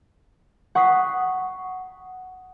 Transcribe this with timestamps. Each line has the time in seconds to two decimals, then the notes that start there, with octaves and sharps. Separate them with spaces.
0.75 F#5 C#6 D#6 B6 C7